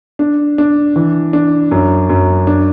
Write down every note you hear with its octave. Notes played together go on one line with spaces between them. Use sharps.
D4
D4
E3
D4
F#2
F#2
D4